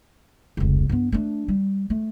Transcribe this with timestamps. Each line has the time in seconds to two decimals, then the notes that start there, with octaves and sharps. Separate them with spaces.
0.57 F1 C#2
0.89 G2 B3
1.12 A3 D4
1.48 G3
1.90 A3